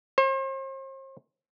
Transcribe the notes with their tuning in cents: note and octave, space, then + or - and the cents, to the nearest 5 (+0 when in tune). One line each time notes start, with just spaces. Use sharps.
C5 +40